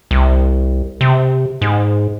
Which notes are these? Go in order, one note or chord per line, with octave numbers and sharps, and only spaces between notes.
C2
C3
G#2